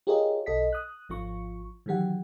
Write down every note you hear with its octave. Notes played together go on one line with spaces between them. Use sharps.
F4 G4 G#4 A#4 C#5 D#5
B1 A4 D#5 B6
D#6 F#6
G#1 F3 F4 C#6
D#3 E3 F#3 G4 F#5